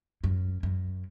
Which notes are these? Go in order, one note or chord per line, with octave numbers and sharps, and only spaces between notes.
F#2
F#2